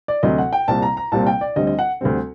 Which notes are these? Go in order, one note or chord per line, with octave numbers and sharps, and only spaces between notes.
D5
D2 C3 F#3 D#5
F#5
G5
C2 A#2 G3 C4 A5
A#5
A#5
C2 A#2 G3 C4 A5
G5
D5
D2 D3 G3 C4 D#5
D#5
F#5
D2 D3 G3 C4